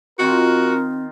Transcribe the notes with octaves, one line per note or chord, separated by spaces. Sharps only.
D#3 C4 F4 F#4 A#4